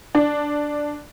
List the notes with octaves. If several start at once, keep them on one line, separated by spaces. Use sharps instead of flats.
D4